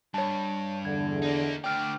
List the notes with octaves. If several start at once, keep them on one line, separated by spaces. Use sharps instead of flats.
G2 C#5 A5
E2 D3 G#6
A#3 D#4
D2 D5 G5 F6